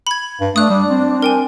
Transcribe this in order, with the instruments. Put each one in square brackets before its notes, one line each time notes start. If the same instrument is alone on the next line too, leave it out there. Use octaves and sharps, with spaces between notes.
[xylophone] B5 G#6
[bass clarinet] G2
[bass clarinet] A3 [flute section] D4 [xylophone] D#6 F#6
[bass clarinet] G3
C4
[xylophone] A#4 G5 G#5